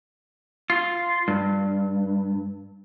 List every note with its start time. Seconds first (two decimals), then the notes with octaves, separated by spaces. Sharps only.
0.70 F4
1.28 G2